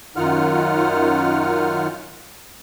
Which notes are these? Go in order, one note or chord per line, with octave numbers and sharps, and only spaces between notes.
F#2 D#3 D#4 F4 F#5 F6